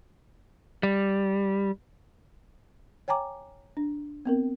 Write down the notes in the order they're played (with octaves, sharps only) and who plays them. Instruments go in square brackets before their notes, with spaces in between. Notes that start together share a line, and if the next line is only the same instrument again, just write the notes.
[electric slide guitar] G3
[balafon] C#5 G5 G#5 A#5 D6
D4
B3 C4 A#4